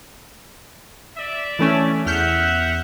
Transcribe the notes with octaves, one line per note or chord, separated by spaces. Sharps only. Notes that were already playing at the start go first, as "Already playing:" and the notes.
D5 E5
E3 A3 C#4
E2 E5 F#5 F6 G6